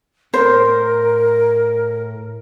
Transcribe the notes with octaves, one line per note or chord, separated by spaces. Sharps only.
A2 A#4 C5